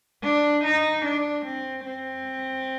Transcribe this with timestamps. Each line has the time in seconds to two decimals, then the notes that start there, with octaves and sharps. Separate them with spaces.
0.23 D4
0.64 D#4
1.05 D4
1.45 C4
1.86 C4